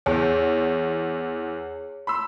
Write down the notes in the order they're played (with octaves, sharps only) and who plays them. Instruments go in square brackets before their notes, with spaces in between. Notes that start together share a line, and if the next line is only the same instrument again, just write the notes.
[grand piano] E2 [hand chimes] G#4 C#5
[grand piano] B5 C6 E6